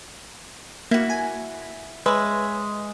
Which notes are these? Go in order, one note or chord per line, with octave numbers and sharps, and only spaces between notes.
A#3 E4 F#4
G#5
G#3 B4 C#5 E5